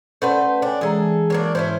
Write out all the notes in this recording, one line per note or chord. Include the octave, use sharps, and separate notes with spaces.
A3 C#4 B4 C5 D5 F#5
D4 C#5 G5 G#5
E3 G#3 G#4 A4 A#5
F#3 A#3 D4
G#2 C#4 E4 C5